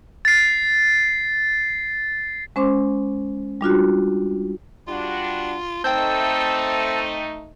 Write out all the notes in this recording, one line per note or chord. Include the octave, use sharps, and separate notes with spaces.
A6 C7
G#3 C#4 C5 C6 D6
G3 D4 F4 F#4
G3 D4 F4 F#4
A3 C4 D#4 G5 A5 E6 G6